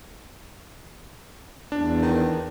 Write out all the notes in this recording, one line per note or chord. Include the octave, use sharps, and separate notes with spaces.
E2 D4
D#3